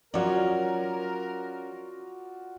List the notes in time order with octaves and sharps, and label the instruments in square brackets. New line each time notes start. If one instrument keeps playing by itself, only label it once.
[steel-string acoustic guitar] F#3 C#4 [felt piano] F4 F#4 D5 [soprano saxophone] A#4